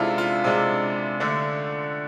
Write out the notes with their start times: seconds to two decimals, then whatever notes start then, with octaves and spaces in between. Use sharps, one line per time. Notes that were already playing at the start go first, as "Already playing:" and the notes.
Already playing: C3 G#3 D4 E4 F4 A4
0.18 F4
0.44 C3 G#3 D4
1.20 D3 A3 D4